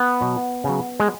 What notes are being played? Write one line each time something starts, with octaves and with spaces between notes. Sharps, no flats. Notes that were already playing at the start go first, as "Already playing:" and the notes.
Already playing: B3
B2 F#3
C#3 F#3
G#3